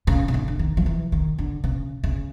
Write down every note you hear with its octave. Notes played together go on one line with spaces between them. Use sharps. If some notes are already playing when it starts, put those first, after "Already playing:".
C#3
C#3
D3
D3
D#3
F3
E3
D#3
D3
C#3
C#3